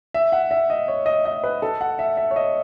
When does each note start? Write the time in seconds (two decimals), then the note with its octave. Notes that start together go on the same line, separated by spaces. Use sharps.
0.14 E5
0.32 F#5
0.51 E5
0.70 D#5
0.88 C#5
1.06 D#5
1.25 D#5
1.44 B4
1.62 A4
1.81 F#5
1.99 E5
2.17 E5
2.31 C#5
2.36 D#5